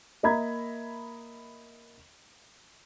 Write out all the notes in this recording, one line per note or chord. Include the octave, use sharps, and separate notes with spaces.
A#3 D#5 E5 A#5 B5 G#6